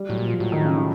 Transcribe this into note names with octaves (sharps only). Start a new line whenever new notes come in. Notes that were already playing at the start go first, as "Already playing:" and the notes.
Already playing: G3
A2 F#3
A#2
F3
A2 F#3
D#3
C#3
C#3